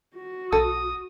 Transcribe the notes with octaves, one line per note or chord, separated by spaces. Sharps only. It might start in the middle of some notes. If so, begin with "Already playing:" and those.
F#4
B1 A4 D#6